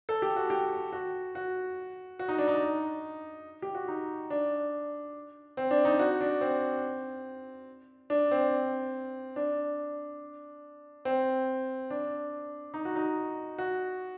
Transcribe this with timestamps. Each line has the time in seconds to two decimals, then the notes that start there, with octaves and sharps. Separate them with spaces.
0.09 A4
0.22 G4
0.36 F#4
0.50 G4
0.93 F#4
1.35 F#4
2.19 F#4
2.28 D#4
2.38 D4
2.48 D#4
3.62 G4
3.75 F#4
3.88 D#4
4.30 D4
5.57 C4
5.71 D4
5.85 D#4
5.99 F#4
6.21 D4
6.41 C4
8.10 D4
8.31 C4
9.36 D4
11.05 C4
11.90 D4
12.74 D#4
12.85 F#4
12.96 D#4
13.58 F#4